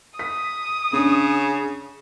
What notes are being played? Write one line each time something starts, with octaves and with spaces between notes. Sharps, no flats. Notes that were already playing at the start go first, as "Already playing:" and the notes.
D#6 B6
C#3 C#4 D4